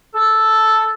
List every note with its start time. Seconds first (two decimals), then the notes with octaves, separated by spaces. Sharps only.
0.14 A4